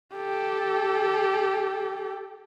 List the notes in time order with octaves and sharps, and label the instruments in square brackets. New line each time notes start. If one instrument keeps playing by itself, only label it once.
[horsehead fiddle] G4 A4